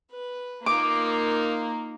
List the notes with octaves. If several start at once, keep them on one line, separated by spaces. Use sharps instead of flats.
B4
A#3 D#4 F4 D6